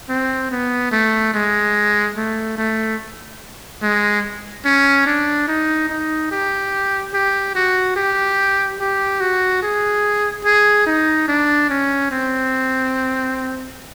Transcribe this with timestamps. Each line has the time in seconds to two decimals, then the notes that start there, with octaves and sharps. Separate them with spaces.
0.09 C4
0.51 B3
0.92 A3
1.34 G#3
2.16 A3
2.58 A3
3.82 G#3
4.65 C#4
5.06 D4
5.48 D#4
5.89 D#4
6.31 G4
7.14 G4
7.55 F#4
7.96 G4
8.80 G4
9.21 F#4
9.62 G#4
10.45 G#4
10.87 D#4
11.28 D4
11.69 C#4
12.11 C4